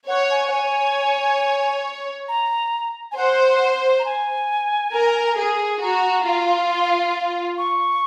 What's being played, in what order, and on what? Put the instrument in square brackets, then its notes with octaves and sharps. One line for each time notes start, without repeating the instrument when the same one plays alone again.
[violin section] C#5 [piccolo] F#5
[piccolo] G#5
F#5
[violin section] C#5 [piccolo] G#5
[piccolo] A#5
G#5
[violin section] C5 [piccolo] F#5
[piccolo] A#5
G#5
[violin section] A#4
G#4
[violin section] F#4 [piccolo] A#5
[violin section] F4
[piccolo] C6
C#6